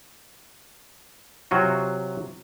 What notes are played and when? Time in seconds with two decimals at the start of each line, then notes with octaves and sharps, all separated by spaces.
1.51 C3 F#3 F4 F#4